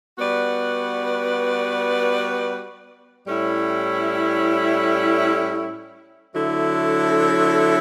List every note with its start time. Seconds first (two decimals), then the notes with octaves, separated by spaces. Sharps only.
0.18 G3 B3 F#4 B4 D5
3.26 A2 G3 C#4 E4
6.35 D3 F#3 A3 E4 A4